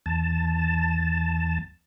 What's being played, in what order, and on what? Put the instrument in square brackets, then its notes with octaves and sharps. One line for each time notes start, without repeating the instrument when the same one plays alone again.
[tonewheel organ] E2 A5